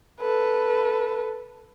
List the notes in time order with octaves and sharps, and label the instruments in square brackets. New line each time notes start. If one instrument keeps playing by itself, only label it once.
[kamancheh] A4 B4